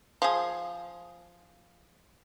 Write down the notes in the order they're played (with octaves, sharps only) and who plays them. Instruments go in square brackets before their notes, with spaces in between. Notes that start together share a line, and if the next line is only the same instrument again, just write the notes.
[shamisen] F3 G#4